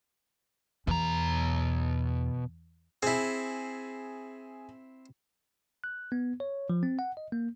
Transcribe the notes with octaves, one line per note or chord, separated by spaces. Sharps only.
E2 B2 A#5
C4 E4 G#4
F#6
B3
C#5
F3
C4
F#5
D#5
A#3